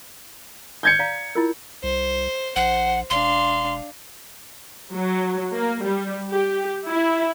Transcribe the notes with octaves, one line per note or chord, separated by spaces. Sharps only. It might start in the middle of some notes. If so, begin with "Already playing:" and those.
G6 G#6 C#7
D5 F5 A#5
E4 F4 A#4
C2 C5
A#1 C5 F#5
E1 D4 F5 C6
F#3
A#3
G3
G4
E4